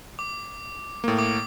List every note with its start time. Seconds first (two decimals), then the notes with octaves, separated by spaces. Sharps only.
0.19 D6
1.04 A2 A#3
1.19 D6